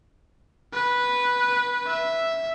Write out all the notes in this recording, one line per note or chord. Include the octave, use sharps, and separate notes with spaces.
B4
E5